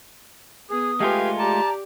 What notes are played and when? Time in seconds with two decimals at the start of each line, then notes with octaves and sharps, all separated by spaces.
0.70 B3 G#4 D#6
1.00 G#3 A3 F4 G4 B4 F5 G#5
1.39 G4 D5 A5 A#5